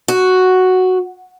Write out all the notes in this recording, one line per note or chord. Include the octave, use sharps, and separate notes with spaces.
F#4